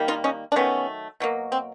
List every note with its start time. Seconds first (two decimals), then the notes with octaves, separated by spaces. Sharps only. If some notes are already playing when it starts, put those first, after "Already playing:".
Already playing: D#3 G3 A#3
0.08 D#4 F4
0.24 C#4 D#4
0.52 D4
0.56 D#3 F#3 A3 B3 C#4
1.20 B2 F#3 A#3
1.52 C4